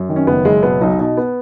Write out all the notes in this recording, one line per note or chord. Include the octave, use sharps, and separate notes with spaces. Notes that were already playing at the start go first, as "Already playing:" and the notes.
Already playing: F#2
D#3
C#4
F#1 B3
F#1 G#3
B2 B3
B1 D#4
B2 D#4
B3